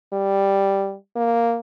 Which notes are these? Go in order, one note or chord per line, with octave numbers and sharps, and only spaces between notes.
G3
A#3